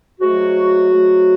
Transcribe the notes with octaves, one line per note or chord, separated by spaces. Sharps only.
G#2 F#3 A3 F#4
G#2 F#3 A3